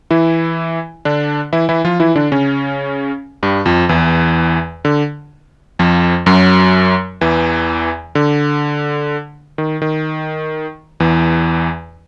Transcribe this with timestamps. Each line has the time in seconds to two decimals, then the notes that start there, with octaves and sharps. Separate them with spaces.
0.11 E3 E4
1.05 D3 D4
1.53 E3 E4
1.69 E3 E4
1.85 F3 F4
2.00 E3 E4
2.16 D3 D4
2.32 C#3 C#4
3.43 G2 G3
3.66 F2 F3
3.89 E2 E3
4.85 D3
5.79 F2 F3
6.26 F#2 F#3
7.21 E2 E3
8.15 D3
9.58 D#3
9.82 D#3
11.00 E2 E3